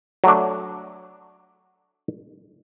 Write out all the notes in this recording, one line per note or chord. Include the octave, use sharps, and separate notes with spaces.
F#3 A3 D4